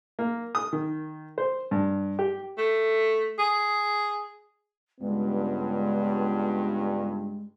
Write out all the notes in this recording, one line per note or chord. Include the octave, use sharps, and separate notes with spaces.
A#3
D#6
D#3
C5
G2
G4
A3
G#4
C#2 G2 G#3 B3